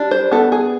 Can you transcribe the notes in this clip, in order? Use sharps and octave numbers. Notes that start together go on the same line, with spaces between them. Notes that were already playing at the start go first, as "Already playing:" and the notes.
Already playing: G3 D4
C5
B3 A4
G#4